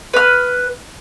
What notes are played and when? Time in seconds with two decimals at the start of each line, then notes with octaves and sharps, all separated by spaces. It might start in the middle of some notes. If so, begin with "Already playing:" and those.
0.14 B4 F6